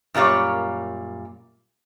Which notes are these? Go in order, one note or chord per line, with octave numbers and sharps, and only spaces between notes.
F#2 A#2 G3 A#3 C#5